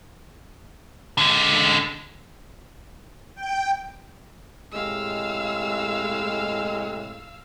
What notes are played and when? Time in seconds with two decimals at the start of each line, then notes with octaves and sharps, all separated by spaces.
1.18 D3 G#3
3.35 G5
4.72 A2 C3 G#3 F5 E6